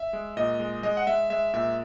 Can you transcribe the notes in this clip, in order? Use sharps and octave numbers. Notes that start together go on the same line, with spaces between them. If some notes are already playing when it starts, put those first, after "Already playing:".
Already playing: E5
G#3
A#2 D#5
G#3
G#3 D#5
F#5
G#3 E5
G#3 E5
A#2 E5